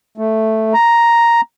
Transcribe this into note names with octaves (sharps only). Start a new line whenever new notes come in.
A3
A#5